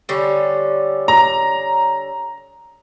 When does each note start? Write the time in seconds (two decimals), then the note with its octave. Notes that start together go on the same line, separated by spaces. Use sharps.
0.09 D3 G3 C#4
1.08 A#5